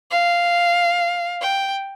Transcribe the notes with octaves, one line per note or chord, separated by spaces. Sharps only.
F5
G5